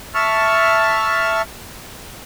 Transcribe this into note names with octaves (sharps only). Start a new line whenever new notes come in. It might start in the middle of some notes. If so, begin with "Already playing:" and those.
E5 A5 C#6 F6